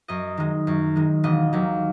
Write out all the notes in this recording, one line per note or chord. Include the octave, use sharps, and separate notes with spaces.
F#2 D#5
D#3 G#3
F#2
D#3 G#3
E1 D#5
D#2 D#3 F#3